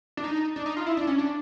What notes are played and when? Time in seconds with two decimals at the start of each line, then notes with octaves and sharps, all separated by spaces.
0.17 D4
0.24 D#4
0.56 D4
0.66 D#4
0.77 F4
0.86 E4
0.97 D4
1.07 C#4
1.18 D4